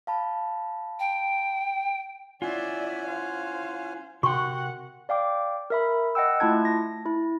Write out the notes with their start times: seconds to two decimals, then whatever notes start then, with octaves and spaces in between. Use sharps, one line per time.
0.07 F5 A5 B5
1.00 G5
2.42 C#4 E4 F4 D5 E5 F#5 G#5
3.07 C5 F5
4.23 C3 F#4 A#4 F#5 G5 C6 C#6
5.09 D5 F5 G5 D6
5.70 A#4 E5 B5
6.15 D#5 F#5 G5 E6
6.40 A3 E4 F4 A5 G#6
6.65 A#6
7.06 E4